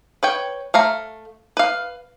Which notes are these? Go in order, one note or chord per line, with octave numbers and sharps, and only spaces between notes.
B4 C#5 G5
A3 F5 A#5
B4 F5